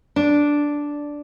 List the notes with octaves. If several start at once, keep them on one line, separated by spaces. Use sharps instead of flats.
D4